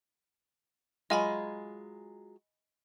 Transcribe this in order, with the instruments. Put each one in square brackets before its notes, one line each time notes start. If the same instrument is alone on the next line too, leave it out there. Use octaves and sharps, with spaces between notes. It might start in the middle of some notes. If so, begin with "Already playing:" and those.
[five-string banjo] F#3 G#3 F4 [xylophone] D#5 G#5 B5